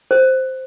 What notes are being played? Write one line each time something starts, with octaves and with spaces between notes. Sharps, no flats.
C5